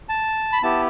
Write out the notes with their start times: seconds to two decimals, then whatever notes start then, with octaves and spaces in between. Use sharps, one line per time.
0.09 A5
0.53 B5
0.62 B3 E4 G4 A5